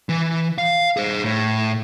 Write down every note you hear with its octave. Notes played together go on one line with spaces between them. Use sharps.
E3
F5
G#4 C5
A2